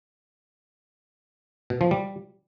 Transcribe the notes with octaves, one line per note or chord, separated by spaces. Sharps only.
B2
F3
G3